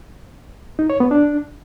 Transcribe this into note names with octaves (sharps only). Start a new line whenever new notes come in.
D#4
C#5
B3
D4